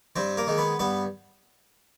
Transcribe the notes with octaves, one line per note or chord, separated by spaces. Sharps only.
G2 C4 C5
A#3 A#4
D#3 G#3
B3 B4
G2 B3 B4